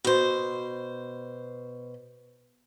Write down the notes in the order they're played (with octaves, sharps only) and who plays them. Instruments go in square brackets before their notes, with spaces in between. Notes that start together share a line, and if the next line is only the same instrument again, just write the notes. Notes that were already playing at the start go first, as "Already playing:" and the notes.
[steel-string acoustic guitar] B2 C5